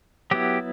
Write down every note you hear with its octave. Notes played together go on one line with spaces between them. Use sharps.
F#3 B3 E4 G4